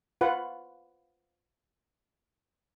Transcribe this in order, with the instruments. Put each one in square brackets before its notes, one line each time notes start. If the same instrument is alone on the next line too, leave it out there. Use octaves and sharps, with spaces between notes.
[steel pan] F4 B4 F#5